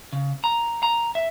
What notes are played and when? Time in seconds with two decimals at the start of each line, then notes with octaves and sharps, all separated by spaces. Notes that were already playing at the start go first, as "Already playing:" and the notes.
0.13 C#3
0.44 A#5
0.83 A#5
1.15 E5